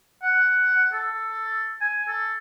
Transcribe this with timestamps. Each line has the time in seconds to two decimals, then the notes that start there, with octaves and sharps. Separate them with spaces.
0.23 F#5
0.93 A4
1.81 G#5
2.08 A4